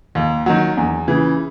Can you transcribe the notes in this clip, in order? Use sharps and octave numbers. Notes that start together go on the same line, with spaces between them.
D#2
D#3 F#3
E2
C#3 E3